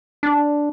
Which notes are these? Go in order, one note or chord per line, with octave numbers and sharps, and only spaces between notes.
D4